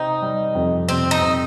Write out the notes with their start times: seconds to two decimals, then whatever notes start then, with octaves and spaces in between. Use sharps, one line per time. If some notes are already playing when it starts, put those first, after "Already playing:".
Already playing: C3 C4 D#4
0.22 G3
0.55 F2
0.88 C3 C4
1.11 D#4
1.22 C3